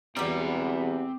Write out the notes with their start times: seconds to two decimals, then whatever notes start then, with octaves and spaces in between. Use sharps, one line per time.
0.16 E1 E2 G3 B3 C4 A#5 D6